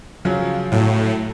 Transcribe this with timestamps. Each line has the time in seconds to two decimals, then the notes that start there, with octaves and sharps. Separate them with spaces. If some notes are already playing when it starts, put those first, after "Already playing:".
0.25 C#3 F3 F#3
0.72 A2 F#3